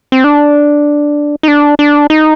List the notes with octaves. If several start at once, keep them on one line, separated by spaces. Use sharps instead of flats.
C4
D4
D#4
D4
D4
D#4